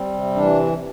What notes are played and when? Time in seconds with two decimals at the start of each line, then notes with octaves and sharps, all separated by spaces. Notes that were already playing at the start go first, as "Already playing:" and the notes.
Already playing: G3 C4
0.14 C3
0.35 E3 D4